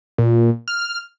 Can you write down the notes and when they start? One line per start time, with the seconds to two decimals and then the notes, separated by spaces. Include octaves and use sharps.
0.18 A#2
0.68 F6